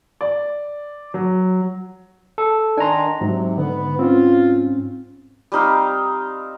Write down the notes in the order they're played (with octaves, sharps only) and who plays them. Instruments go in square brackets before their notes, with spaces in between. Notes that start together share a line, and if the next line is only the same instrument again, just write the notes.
[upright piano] D5
F#3
[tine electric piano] A4
[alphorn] D#3 [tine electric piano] D4 A#5 [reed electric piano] G#5 C6
[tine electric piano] G#2 [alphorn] C3 [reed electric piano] F#3
[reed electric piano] D3 [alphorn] B3
[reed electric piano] C4 C#4 [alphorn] F4
[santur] G3 C4 D#4 F5